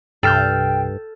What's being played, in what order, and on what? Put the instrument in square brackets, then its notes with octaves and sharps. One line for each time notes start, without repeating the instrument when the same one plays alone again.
[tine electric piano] C2 C3 C7 [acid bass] G2 [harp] A4 F6 G6 [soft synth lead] G5